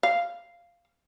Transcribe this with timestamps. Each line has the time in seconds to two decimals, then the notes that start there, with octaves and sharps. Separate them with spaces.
0.03 F5